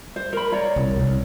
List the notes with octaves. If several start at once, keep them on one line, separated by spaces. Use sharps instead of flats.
C5
A#4 B5
C#5 D5 A#5
C2
C2